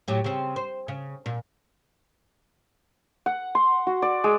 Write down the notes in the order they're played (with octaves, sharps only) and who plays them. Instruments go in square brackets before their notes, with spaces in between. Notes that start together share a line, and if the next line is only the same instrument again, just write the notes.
[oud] A2 F#3 G4
C#3 C4
C5
C#3
A#2
[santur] F#5
C6
F#4
D5
G#3